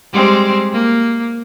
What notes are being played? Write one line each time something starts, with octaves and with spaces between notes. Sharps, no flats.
G3 G#3 C4
A#3